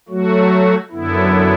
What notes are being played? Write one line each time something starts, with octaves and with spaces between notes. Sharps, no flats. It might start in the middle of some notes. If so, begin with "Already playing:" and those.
F#3 A3 F#4
F#2 D3 B3 E4